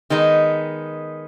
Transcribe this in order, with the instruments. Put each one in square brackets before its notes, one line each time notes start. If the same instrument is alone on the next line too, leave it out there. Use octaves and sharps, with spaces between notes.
[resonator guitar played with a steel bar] D#3 G#3 B3 D#4